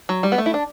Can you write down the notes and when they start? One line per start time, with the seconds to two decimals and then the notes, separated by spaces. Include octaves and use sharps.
0.09 F#3
0.23 G3
0.32 B3
0.38 A3
0.46 E4
0.54 D4